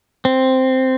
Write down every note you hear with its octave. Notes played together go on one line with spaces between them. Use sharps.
C4